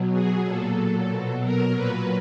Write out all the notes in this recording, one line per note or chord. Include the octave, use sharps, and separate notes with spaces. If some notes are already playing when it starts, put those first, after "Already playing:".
Already playing: B2 F#3
G#4
A#2 F#3 A4
B2 F#3
A#4
A#2 F#3 B4